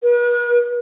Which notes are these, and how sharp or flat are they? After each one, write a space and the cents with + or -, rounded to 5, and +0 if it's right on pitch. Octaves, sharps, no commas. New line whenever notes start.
B4 -45